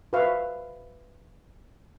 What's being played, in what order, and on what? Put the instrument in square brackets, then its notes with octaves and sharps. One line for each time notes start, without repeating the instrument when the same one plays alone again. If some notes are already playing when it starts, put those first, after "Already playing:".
[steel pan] F#4 B4 C5 E5 F5 C#6